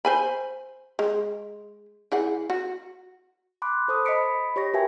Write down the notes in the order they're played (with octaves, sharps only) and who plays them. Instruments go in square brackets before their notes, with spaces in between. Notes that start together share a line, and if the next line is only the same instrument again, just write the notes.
[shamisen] C5 G#5 B5
G#3
E3 G#4 F#5
F#4
[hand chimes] B5 C6 D6 F#6
A4 C5 B5 D#6
D#5 B5 D#6 B6 C#7 D7
G4 C#5 C#6 A#6
F#4 A#4 B4 E5 G5 G#5